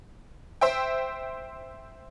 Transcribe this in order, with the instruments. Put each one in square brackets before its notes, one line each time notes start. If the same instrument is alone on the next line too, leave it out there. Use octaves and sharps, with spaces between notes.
[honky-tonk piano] C5 E5 G5